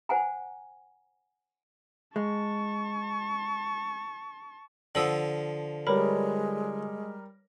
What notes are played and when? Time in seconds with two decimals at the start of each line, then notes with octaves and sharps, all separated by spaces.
0.09 C5 F#5 G#5 A#5
2.16 G#3 A5 C#6
4.95 D3 F3 F#5 D#6 E6 F#7
5.87 G3 G#3 A#4 B4 C#5 B5